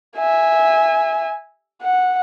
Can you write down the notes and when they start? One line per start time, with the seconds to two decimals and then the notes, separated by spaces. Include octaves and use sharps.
0.17 E5 G#5
1.83 F#5